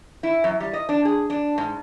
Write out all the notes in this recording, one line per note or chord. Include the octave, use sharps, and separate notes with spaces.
E4
F#2
G3
D#5
D4
G#4
D4
G#2